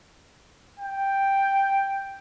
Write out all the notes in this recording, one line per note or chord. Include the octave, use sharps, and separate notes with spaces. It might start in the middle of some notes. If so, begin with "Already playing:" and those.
G5